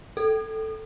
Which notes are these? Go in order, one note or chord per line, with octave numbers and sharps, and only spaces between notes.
A4